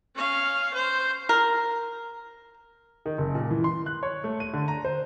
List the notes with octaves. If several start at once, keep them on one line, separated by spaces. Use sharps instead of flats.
C#4 F5
C5
A#4
D#3
F#1
A#2
E3
C6
F#6
C#5
A3
D#7
D3
A#5
C5